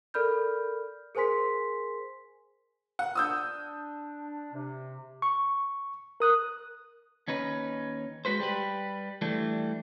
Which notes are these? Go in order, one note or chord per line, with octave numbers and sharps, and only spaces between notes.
A4 A#4 D5 B5 F6 G6
G#4 A#4 C5 G#5 C6 B6
F#5
D4 D#6 E6 G6
C3
C#6
A#4 D#6 F#6
D#2 C#4 D#4 B4
G#3 F#4 B4 C5
G3 G4 B4
E3 G3 A3 D4